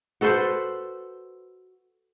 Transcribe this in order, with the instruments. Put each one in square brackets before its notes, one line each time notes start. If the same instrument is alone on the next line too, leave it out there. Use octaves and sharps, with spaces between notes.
[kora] F#4 A4 B4 C5